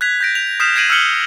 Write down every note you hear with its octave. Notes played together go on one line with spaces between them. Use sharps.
F#6 G#6 B6 F7
G6 A#6 D7
F7
D#6 F6 G6 B6 C7 E7
G#6 A#6 C7 D7 D#7 F#7
E6 F6 G6 C#7 F#7 G7